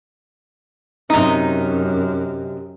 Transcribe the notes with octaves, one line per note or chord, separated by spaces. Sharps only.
F#2 C3 D#4